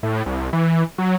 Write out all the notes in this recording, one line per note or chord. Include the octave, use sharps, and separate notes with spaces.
A2
C2
E3
F#3